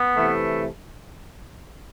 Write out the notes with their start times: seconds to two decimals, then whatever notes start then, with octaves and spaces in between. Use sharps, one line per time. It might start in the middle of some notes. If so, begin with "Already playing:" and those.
Already playing: B3
0.14 C3 E3 A3